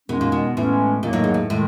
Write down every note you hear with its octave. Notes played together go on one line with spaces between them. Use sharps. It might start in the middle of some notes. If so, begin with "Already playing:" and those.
B2 D#3 G#3 C#4
A#2
B2
A2 E3 G#3 C#4
A#2 D#3 F#3 A#3
A2
G#2
A2
A2 D#3 G#3